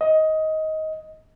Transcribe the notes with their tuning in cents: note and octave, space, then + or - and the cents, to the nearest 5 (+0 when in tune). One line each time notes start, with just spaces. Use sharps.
D#5 +15